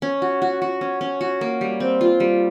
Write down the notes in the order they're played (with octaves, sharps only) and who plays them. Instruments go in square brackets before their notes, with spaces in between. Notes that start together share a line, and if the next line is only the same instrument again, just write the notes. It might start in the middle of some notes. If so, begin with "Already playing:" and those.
[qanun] C#4
F#4
F#4
F#4
C#4
C#4
F#4
A#3
G3
C4
F4
G3